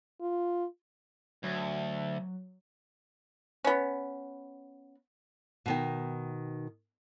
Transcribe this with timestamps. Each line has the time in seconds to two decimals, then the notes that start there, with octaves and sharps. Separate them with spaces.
0.21 F4
1.44 D2 F#3
3.64 B3 C#4
5.66 B2 D#3 G5